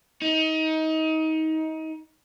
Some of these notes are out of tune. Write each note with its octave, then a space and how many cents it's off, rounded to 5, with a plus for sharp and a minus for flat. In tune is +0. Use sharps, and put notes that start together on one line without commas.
D#4 +25